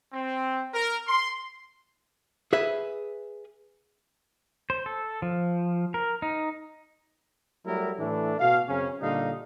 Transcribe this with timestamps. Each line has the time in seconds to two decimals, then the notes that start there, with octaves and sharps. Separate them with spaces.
0.13 C4
0.73 A#4
1.07 C6
2.53 G#4 B4 E5
4.70 C5
4.86 A4
5.22 F3
5.94 A#4
6.22 D#4
7.66 F#3 G3 A3 E4 A#4
7.99 A2 E3 A3 D4
8.39 B2 F5
8.69 F#2 C#3 C4 C#4
9.01 A#2 D3 G3 D#4 F5